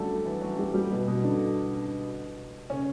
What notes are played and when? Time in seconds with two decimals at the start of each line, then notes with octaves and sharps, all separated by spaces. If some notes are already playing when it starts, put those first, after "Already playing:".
Already playing: D3 F#3 G3 A3 D4 F#4 G4 A4
0.25 E3 E4
0.41 F#3 F#4
0.58 G3 G4
0.74 G3 G4
0.91 B2 B3
1.07 B2 B3
1.23 D3 D4
2.70 C#3 C#4